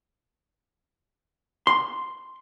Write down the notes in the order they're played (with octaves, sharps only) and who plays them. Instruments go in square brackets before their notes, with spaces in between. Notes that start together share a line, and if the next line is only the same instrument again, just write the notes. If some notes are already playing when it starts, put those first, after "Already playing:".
[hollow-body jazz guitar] C6